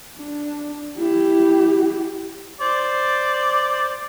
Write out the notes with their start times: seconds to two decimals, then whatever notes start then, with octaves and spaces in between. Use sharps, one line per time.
0.19 D4
0.99 E4 G4
2.61 C5 D5